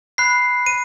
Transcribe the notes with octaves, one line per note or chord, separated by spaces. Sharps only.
B5 F#6 C7
D#7